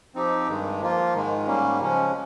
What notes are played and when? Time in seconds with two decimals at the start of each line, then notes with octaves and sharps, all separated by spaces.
0.15 F3 C4 D#4 G4
0.48 G2 D#3 G#3
0.81 F3 A#3 F4
1.15 G#2 D#3 G#3
1.47 G#2 G3 A#3 C#4
1.81 C#3 F3 G#3 C#4